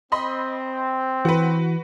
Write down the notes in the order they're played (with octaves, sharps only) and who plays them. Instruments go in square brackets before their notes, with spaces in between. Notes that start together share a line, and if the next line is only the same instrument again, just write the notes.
[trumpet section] C4 [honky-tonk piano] D#5 B5 C6
[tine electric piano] E3 [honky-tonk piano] F#4 B4